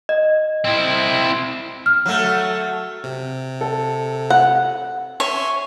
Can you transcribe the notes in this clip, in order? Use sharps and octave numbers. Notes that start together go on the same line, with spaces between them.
D#5
C4 E4
F6
F#3 A3
C3
A4
F#5
C#5 E5 G#5 C6